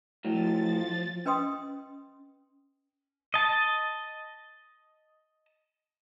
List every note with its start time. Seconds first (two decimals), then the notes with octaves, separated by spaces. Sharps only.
0.25 A2 F3 F#3 A6
1.25 C#4 B4 D#5 G5 C6 D#6
3.34 D#5 A5